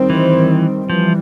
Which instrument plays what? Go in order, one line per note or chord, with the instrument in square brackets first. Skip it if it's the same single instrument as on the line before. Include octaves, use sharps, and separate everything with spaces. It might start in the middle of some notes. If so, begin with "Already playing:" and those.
Already playing: [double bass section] D#3 G3 C4
[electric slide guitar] E3
[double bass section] E3 G3 [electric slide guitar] F3